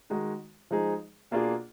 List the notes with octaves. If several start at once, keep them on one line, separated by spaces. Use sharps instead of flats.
D#3 G#3 D#4 F#4
F3 G#3 D#4 G#4
B2 A#3 D4 F4 G#4